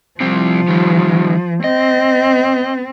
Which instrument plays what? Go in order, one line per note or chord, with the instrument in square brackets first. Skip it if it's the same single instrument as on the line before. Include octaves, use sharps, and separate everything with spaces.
[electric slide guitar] C3 G3 C4 [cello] F3
[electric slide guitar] D#3 G3
[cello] C4 [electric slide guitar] D#5